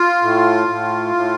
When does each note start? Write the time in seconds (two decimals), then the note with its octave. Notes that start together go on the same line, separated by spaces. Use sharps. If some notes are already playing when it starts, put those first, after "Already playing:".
Already playing: F4
0.22 A2
0.68 A2
1.15 A2